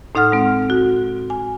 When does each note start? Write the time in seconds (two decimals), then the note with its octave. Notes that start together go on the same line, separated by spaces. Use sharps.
0.15 A2 D#4 A4 F#5 F6
0.32 G#3 C4
0.70 F#4
1.30 G#5